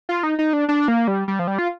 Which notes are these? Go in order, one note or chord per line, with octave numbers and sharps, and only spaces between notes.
F4
D#4
D#4
D4
D4
A#3
G3
G3
F3
G3
F4